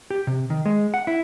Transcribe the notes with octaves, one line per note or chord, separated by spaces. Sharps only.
G4
C3
D#3
G#3
F#5
E4